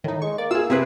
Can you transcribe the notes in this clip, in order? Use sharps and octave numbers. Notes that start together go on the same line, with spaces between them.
A2 D#3 D#4
G#3 C#6
A#3 D5
F4 G#4 E6
C3 E4 G#4 B4